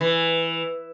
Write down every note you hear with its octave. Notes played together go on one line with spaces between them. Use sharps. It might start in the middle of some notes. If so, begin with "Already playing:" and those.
E3